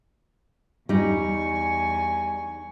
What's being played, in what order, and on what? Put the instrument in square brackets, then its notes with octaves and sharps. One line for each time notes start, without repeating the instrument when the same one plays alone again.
[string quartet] E2 G#5 C#6 [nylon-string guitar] G3 D#4